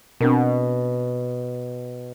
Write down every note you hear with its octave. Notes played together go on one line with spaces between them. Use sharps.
B2 C4 D4 A#4